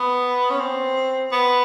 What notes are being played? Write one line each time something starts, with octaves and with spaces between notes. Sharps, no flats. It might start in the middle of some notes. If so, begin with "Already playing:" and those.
Already playing: B3
C#4
C4
B3